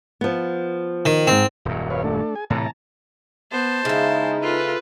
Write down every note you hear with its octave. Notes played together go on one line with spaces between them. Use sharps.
F3 B3
D#3
F2 G#2 C4
D#1 F#2
B4 C#5 F5
A3 D4 A4
G#4 G#5
A2 C3 E3 A5 A#5
B3 C5 A5
C#3 G#3 D#4 E4
F4 A4 B4